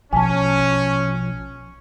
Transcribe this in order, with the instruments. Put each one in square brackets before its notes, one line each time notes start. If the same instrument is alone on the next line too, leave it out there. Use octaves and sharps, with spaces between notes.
[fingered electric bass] A#1 B2 F3 [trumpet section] C#4 [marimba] G#5 A5